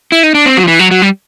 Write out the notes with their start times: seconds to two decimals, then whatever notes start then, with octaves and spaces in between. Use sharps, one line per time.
0.12 E4
0.23 D#4
0.35 D4
0.46 C4
0.57 F#3
0.64 F3
0.68 E3
0.79 F#3
0.91 F#3
1.02 G3